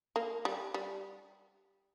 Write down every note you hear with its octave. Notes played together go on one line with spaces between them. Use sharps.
A#3
G3
G3